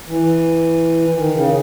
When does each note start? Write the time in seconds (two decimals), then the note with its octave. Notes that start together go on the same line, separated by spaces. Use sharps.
0.08 E3
1.16 D#3
1.34 C#3